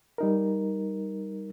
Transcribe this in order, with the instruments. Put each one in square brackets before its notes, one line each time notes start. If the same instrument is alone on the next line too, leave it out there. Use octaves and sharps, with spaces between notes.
[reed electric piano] G3 D#4 A#4